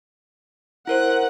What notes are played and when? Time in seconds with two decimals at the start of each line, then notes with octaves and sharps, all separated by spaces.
0.87 E4 A#4 C5 F#5